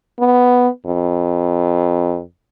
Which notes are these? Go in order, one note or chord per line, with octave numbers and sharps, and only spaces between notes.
B3
F2